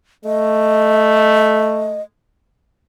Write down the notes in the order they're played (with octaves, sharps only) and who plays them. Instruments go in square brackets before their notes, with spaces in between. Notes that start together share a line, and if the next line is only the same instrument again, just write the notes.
[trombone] A3 [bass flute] D#5